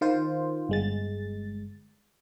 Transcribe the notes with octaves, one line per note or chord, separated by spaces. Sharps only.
D#3 F4 C5
G1 G#3 A6